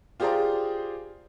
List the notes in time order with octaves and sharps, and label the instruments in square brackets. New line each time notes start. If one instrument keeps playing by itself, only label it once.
[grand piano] F4 G4 G#4 C5 D5 A#5